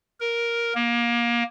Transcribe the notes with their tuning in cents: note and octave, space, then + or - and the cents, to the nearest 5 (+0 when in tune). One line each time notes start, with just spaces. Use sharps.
A#4 +5
A#3 +25